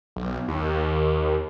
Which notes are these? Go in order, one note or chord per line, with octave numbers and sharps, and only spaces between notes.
B1
D#2